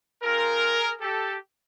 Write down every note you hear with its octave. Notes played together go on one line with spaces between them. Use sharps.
C4 F4 G#4 A#4
G4 A4